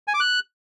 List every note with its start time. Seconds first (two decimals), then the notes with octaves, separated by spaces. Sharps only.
0.08 G#5
0.14 D6
0.20 F#6